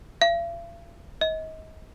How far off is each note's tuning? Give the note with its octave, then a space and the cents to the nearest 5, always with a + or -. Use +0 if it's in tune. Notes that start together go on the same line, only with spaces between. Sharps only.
F5 -45
D#5 +30